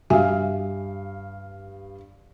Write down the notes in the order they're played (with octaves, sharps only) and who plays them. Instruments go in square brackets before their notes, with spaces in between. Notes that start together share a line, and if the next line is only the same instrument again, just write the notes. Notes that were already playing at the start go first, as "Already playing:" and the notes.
[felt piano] G2 F5 [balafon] F#4 E5 G#5